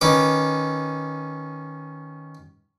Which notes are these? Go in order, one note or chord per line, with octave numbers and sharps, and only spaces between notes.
D#3 C#4 B4 D6